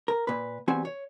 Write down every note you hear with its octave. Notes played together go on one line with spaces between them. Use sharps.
A#4
A#2 B4
E2 G3 C4 F#4 G#5
C#5